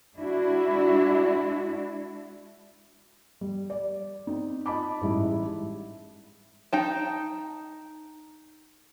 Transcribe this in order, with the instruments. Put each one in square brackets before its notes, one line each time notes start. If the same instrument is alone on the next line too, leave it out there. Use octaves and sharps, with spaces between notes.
[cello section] G#3 D4 E4 F#4
[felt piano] G3
D5
C4 D#4
F4 D#5 A5 B5 D6
A1 G#2 G3 E4
[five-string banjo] D#4 G5 A5